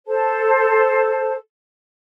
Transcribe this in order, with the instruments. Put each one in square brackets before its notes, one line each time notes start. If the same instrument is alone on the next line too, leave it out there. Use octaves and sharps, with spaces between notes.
[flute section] A4 C5 A5